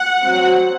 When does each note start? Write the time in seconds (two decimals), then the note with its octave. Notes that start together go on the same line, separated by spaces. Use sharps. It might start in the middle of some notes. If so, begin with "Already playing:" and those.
Already playing: F#5
0.21 F#3 C4